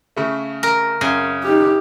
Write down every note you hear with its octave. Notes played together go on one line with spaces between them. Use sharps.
C#3 A3
A#4
F#2 C#3
D#4 G4